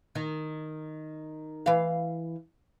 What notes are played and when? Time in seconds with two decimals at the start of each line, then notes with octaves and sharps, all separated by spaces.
0.15 D#3
1.66 E3 F5